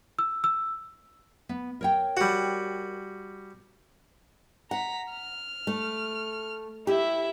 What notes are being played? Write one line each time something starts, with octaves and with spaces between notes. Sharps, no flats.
E6
E6
B3
A#4 C#5 G5
G3 F#4
F#5 A#5 B6
F6
A3
E4 G4 E5